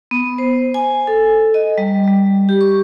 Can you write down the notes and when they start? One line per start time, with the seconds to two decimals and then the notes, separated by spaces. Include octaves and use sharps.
0.11 B3
0.38 C5
0.74 G#5
1.07 A4
1.54 D#5
1.78 G3
2.07 G3
2.49 G4
2.61 C#6